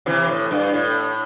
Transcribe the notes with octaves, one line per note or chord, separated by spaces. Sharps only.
C3 E3
A2
G2
A2